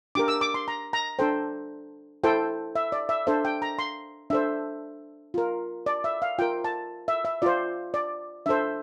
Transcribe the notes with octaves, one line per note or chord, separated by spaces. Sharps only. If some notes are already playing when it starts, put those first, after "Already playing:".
D4 G4 A#4 D6
E6
D6
C6
A#5
A#5
D4 A4 C5 G5
E4 A4 C5 G5
E5
D5
E5
D4 A4 C5 E5
G5
A#5
C6
D4 A4 C5 E5
F4 A#4
D5
E5
F5
F4 A#4 G5
A5
E5
E5
F4 C5 D5
D5
D4 A4 C5 E5